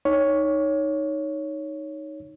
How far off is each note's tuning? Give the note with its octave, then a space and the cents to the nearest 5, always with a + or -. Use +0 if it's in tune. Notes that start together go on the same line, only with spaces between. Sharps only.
D#4 +0 C#5 +5